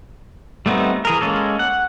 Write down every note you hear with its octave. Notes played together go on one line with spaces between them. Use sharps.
G3 A3 B3 C4 D#4
E3 G#4 A#4
G#3 A#3 C#4 A4
F#5